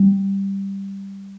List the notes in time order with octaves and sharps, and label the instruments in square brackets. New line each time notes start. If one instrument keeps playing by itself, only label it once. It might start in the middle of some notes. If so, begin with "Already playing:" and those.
Already playing: [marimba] G3